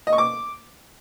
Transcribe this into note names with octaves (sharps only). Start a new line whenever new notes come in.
D#5
C#6
D6